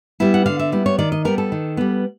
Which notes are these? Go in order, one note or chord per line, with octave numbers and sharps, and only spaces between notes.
G3 B3 E4
F#5
D3 F5
E5
G3 B3 E4
C#5
D#3 D5
D#5
G3 B3 A#4
A4
D#3
G3 B3